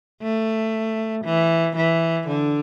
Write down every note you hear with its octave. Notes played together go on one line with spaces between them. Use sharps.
A3
E3
E3
D3